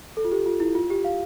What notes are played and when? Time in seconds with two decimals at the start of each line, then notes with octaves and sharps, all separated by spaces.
0.17 A4
0.24 F4
0.32 G4
0.46 F4
0.60 E4
0.75 F4
0.90 G4
1.04 F5